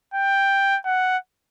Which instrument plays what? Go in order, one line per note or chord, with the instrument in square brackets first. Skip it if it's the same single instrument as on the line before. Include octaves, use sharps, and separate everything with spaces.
[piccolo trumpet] G5
F#5